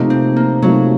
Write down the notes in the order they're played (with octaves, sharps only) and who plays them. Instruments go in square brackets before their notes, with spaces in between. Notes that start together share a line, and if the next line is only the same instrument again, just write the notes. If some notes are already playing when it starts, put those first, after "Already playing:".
Already playing: [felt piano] C3 F3 A3 D#4 [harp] A#3
[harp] C4
A#3
[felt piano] C3 F3 A3 D#4 [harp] F#3